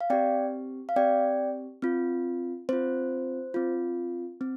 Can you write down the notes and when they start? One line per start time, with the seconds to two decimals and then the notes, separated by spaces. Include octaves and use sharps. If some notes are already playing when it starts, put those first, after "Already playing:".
0.01 F5
0.10 C4 G4 D5 G5
0.89 F5
0.96 C4 G4 D5 G5
1.82 C4 F4
2.69 C4 F4 C5
3.54 C4 F4
4.41 C4